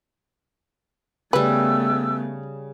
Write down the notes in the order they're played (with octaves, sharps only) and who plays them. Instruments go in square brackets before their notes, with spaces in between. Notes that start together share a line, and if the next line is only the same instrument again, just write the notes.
[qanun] C#3 G3 [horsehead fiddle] A3 B3 [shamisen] B4 [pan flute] E6